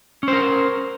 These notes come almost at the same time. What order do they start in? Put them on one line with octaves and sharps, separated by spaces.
C#4 C5 A#4